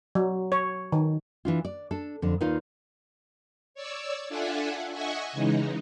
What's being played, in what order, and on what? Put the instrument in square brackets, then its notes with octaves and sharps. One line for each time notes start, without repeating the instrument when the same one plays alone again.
[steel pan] F#3
C#5
D#3
[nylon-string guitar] E3 D4 F4
D5
D4 A4
F2 D3
D#2 D#4 F4 B4 D5 F5
[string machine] C#5 D5 E6
D4 F4 A4 E5 F#5 G#5
D#5 E5 F#5 G#5 C#6
C#3 E3 G#3 D#4